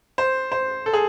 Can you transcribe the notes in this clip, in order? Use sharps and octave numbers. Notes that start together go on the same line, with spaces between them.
C5
C5
A4
G#4